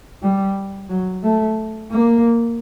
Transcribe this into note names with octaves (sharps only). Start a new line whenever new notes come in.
G3
F#3
A3
A#3